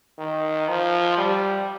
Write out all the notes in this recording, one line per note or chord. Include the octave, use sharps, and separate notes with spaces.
D#3
F3
G3